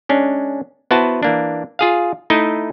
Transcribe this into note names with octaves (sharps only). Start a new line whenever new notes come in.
G#3 C#4 D4
B3 E4 F#4 B4 C5 A5
E3 A#3 D4
F4 G#4 F5
A3 D#4 E4 D#5